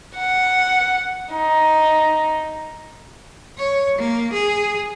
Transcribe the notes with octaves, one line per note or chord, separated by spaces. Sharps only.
F#5
D#4
C#5
A#3
G#4